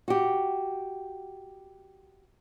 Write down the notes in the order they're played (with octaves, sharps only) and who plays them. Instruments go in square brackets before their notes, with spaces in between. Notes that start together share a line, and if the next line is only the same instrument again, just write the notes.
[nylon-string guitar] F#4 G4